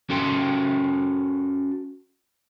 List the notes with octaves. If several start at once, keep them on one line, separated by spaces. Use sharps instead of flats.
C#4 F#4 A4 G5 C6